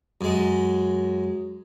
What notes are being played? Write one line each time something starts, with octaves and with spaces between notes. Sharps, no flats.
F#2 G#3